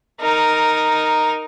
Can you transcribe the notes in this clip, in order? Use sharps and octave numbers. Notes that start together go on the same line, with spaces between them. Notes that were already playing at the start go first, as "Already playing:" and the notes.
D#4 A#4